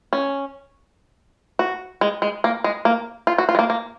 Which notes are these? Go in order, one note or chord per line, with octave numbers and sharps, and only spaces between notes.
C#4
F#4
G#3
G#3
A#3
G#3
A#3
F4
F#4
F4
G#3
A#3
A#3